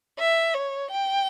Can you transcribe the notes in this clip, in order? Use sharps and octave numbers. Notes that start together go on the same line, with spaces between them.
E5
C#5
G5